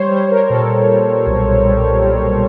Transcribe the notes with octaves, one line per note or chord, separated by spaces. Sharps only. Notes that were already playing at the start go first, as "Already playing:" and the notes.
Already playing: G3 C5 C#5
G3 C5
A#4
A#4
A#2 A4
G3
B1
G3
G3